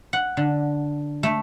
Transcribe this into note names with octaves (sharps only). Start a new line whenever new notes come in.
F#5
D3
A3